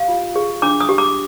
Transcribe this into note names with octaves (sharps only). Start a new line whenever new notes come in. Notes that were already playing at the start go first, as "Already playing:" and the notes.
Already playing: G4 F5
F4
G#4
D4 D6
D#6
G4
D6